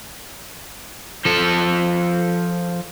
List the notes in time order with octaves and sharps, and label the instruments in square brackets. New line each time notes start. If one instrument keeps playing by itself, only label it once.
[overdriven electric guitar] F3 A4